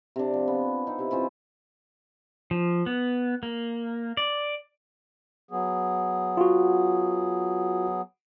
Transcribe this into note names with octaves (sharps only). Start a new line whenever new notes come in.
C3 D4
F3
B3
C4 D#4
C3 E4
E3 C#4 F4 C5
F3
B3
A#3
D5
F#3 B3 G#4
F4 F#4